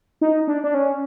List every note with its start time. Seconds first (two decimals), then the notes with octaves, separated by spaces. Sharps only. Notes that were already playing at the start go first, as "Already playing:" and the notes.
0.21 D#4
0.47 D4
0.64 D4
0.74 C#4